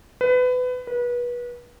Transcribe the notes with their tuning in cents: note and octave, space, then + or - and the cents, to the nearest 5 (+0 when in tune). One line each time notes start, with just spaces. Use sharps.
B4 +25
B4 -30